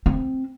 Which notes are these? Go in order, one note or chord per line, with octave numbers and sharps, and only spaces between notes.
C4